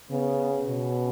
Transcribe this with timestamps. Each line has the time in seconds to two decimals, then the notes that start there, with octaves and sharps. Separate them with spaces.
0.11 C#3 B3
0.65 B2 C#4